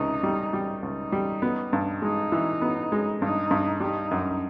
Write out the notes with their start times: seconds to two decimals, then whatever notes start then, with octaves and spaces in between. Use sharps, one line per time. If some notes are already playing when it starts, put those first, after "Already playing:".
Already playing: C#2 C3 D#4
0.23 G3
0.53 G3
0.83 C#2 D#4
1.12 G3
1.42 B3
1.73 G2
2.02 G#3 D#4
2.32 E3
2.61 B3
2.92 G#3
3.21 G2 D#4
3.51 G2
3.80 G3 D#4
4.11 F#2